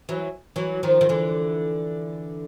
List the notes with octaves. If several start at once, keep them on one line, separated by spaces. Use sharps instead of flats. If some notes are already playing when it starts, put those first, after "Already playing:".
E3 F#3
E3 F#3
D#3 F3
D#3
D3 E3